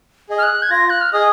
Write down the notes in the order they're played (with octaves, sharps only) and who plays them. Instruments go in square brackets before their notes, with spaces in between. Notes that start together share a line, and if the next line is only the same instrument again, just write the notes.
[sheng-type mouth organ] G#4 D#5
[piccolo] F6
F#6
G#6
[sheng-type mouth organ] F4 [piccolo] A#6
[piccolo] F#6
F6
[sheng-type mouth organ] G#4 D#5 [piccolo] D#6